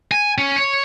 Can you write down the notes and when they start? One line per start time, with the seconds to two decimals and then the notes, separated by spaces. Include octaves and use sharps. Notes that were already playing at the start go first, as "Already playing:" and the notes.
0.12 G#5
0.38 C#4
0.56 C#5